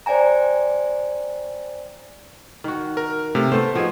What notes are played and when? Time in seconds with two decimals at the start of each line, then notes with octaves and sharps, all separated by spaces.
0.06 C5 D5 G5 G#5 A#5
2.64 D#3 F#4
2.97 A#4
3.35 C3 A3 F5
3.52 A3 B3 A4 C5
3.75 F3 D#4 F#4 G#4